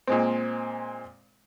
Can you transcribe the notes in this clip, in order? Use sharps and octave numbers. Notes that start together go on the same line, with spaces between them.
A#2 G#3 C4